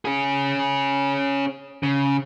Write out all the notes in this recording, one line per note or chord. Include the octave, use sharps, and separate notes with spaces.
C#4 G#4
C#3